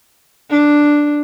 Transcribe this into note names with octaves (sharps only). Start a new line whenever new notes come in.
D4